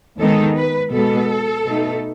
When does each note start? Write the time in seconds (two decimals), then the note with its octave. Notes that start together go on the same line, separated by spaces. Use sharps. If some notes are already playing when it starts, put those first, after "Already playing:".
0.18 D#2 D#3 G#3 B3 D#4 A4
0.55 B4
0.92 B2 G#3 B3 A4
1.66 B2 A3 D#4